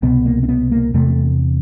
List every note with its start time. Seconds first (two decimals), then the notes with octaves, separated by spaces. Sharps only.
0.02 C2 B2 B3
0.26 A#3
0.43 C4
0.49 B3
0.72 A#3
0.94 E2 C3 A3